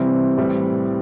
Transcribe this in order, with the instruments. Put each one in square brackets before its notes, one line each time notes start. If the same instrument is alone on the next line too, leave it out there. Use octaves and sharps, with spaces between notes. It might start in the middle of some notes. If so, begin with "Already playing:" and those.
Already playing: [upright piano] C3 E3 G3 C4
A2 E3 G3